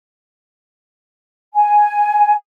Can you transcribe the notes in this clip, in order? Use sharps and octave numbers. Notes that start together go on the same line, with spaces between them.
G#5